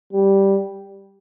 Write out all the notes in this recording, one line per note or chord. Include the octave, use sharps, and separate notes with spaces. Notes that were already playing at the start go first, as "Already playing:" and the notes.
G3